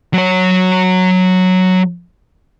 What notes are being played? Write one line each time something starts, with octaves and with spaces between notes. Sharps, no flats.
F#3 C#5